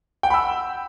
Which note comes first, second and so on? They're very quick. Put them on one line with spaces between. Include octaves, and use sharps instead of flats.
G5 F#5 B5 E6